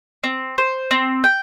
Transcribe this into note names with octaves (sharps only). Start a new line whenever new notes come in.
C4
C5
C4
G5